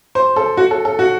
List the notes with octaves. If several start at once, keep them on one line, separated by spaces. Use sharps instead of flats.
C5
A4
F#4
A4
A4
F#4